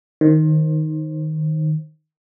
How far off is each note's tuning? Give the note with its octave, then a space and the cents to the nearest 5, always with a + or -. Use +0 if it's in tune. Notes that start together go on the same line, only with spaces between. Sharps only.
D#3 +0 C5 +25